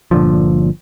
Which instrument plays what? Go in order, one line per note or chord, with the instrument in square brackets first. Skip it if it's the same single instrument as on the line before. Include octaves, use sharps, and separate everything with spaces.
[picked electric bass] G1 A#2 D3 F3